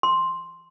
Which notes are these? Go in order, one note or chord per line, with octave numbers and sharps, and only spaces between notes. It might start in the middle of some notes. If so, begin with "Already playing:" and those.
C6